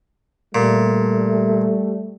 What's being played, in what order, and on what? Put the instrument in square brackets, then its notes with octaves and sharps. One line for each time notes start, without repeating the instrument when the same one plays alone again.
[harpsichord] A#2 [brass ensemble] G3 A3